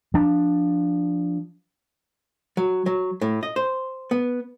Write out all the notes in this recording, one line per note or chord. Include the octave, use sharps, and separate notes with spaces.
F3 D4
F#3
F#3
A2
D#5
C5
B3